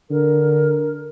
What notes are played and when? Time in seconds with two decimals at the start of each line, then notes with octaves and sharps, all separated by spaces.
0.11 D3 A#4